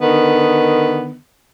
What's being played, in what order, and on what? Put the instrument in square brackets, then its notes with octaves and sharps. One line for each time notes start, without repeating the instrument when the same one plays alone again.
[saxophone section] D3 D#3 B3